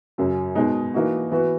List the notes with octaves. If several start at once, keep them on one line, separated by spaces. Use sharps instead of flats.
F#2 C#3 F#3
B2 G#3 D#4
E3 A#3 D#4 F#4
E3 B3 F#4